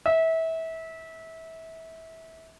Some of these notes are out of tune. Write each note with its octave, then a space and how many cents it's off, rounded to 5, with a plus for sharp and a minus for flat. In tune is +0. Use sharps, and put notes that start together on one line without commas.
E5 -25